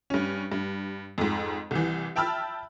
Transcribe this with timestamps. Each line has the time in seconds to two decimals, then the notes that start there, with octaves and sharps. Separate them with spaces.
0.10 G2 C#4
0.52 G2
1.18 F2 G#2
1.71 C2 E3
2.16 E5 G5 A5 B5 E6 F6